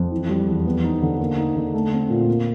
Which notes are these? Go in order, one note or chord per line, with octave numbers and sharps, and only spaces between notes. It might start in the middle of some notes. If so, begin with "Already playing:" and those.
Already playing: F2
E3
G3
E2
B3
D#4
D3
A#3
D#4
D3
A3
C4
A#2
A#3